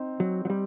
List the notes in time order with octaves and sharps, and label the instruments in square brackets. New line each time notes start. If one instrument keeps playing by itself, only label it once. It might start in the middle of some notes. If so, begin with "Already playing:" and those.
Already playing: [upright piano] C4 D#4
[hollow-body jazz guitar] F#3
F#3
G3